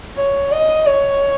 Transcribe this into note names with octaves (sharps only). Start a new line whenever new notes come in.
C#5
D#5
C#5